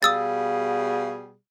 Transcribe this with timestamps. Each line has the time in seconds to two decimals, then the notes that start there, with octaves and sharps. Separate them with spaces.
0.03 B2 G3 G#4 F5 D#6 E6 A6